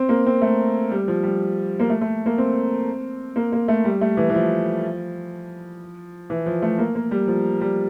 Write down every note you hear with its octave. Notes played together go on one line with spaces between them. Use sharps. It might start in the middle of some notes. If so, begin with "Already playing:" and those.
Already playing: C4
A#3
C4
A3
G3
F3
G3
A#3
A3
A3
A#3
C4
A#3
A#3
A3
G3
A3
E3
E3
F3
E3
F3
A3
A#3
A#3
G3
F3
G3